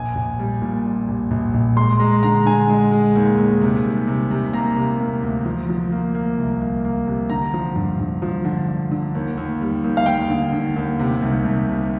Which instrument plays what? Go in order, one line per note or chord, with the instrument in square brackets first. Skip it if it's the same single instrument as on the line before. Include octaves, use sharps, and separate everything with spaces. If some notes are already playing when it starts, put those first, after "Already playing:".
Already playing: [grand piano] A#1 G#5
A#1
G3
A#2
G3
A#1
A#1
A#1
G#3 C6
G#3 A#5
D3 A#5
D3 G#5
G#3
G#3
D#2
D#2
C3
G3
C3
C3
A#3 A#5
C3
A#3
D2
F3
F3
A#3
A#3
C2
A#3
A#3
C3
D3 A#5
F3
G2
G2
F3
D3
D3
D3
D#2
D#2
G3
D#2
F5
D#2 G5
D3
D3
D#2
C3
C2
C2
C3